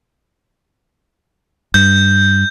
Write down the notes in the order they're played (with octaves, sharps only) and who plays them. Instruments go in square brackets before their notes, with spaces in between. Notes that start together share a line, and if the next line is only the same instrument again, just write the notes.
[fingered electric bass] G2 [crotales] G6